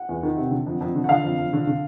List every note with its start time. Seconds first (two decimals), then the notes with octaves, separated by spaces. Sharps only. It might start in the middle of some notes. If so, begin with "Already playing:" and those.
Already playing: F#5
0.09 E2
0.23 D#3
0.37 C3
0.51 D3
0.66 F2
0.81 F2
0.95 D3
1.04 F#5
1.09 D3 F5
1.23 F2
1.38 F2
1.53 D3
1.67 D3